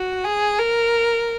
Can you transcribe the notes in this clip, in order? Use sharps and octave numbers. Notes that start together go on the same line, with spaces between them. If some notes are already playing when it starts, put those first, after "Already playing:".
Already playing: F#4
G#4
A#4